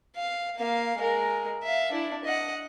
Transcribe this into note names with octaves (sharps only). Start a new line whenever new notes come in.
F5
A#3 F5
G#3 A#4
E5 F5
D4 E4
D#5 F#5